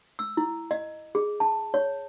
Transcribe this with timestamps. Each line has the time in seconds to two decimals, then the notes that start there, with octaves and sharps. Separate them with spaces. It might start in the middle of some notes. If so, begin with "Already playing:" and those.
0.19 E6
0.37 E4
0.71 D#5
1.15 G#4
1.40 A5
1.74 C#5